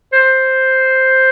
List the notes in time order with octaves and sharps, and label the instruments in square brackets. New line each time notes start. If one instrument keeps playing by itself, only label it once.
[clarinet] C5